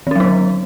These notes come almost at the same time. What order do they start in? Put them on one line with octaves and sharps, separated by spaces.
D#3 C#4 F#3 D#4 D3